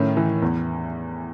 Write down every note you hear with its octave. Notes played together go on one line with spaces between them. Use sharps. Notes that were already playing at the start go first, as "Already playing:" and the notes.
Already playing: A2 D#3 C#4
E3
E2